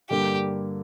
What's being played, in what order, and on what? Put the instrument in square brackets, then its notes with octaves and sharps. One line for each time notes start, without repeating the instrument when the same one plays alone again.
[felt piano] G2 D3 G3 A#3 [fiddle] G4